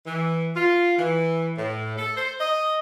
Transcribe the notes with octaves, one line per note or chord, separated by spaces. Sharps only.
E3
F4
E3
A2
A4
C5
D#5